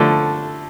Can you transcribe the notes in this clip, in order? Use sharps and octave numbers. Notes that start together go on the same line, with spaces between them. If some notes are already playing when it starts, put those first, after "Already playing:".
Already playing: D3 F3 A3